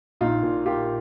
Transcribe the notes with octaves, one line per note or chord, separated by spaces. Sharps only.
A#1 D#4 F4
A#2
A#3 F4 G4